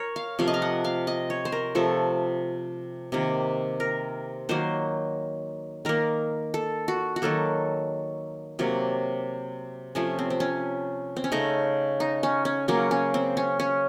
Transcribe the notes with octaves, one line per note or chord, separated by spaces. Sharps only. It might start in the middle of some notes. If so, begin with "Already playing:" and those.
Already playing: A#4 C#5
F5
C3 F3 A3 F5
D#5
F5
F#5
F5
D#5
C#5
C5
A#4
C3 F3 A3 A4
C3 D#3 A#3
A#4
D#3 F#3 A#3 C5
D#3 A#3 A#4
A4
F#4
F#4
D#3 F#3 A#3 A4
C3 F#3 A#3
C3 F3 A3 C#4
C4
C4
C#4
C4
C#4
C#3 A3 D#4
D#4
C#4
C#4
C#3 F#3 A#3 C#4
C#4
C4
C#4
C#4